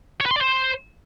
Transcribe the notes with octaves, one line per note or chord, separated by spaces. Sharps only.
C#5
B4
C6
D5
C5